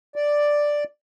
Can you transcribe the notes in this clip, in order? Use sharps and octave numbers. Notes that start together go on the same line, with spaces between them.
D5